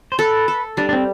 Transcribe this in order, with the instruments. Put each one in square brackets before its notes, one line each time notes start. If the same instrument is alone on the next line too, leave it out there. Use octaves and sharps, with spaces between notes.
[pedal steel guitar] C5
[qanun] A4 [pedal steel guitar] B4
[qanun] A4
[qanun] G3 [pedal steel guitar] D4
[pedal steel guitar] D4
C4